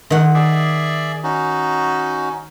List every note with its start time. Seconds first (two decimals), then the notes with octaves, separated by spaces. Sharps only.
0.10 D#3 F#5
0.34 G#4 D5 E5
1.24 C#4 D#4 F#4